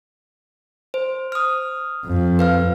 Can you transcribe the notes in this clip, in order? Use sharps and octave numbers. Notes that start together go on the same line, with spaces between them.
C5
D#6 F6
F2
B4 F5 F6